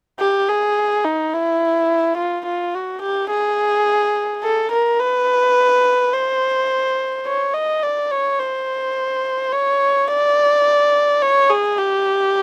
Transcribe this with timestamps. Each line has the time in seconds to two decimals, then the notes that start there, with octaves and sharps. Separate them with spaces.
0.20 G4
0.49 G#4
1.05 D#4
1.33 E4
2.18 F4
2.47 F4
2.75 F#4
3.02 G4
3.31 G#4
4.43 A4
4.72 A#4
5.00 B4
6.14 C5
7.26 C#5
7.54 D#5
7.83 D5
8.11 C#5
8.39 C5
9.53 C#5
10.08 D5
11.22 C#5
11.50 G#4
11.78 G4